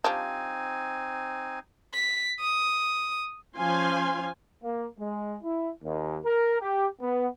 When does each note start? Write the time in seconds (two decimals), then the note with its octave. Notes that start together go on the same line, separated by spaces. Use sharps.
0.04 F3 G3 C4 D4 D#4 G#5
1.94 B6
2.40 D#6
3.58 F3 C#4 F5 G#5 C6
4.63 A#3
4.99 G#3
5.43 E4
5.83 D#2
6.25 A#4
6.61 G4
7.01 B3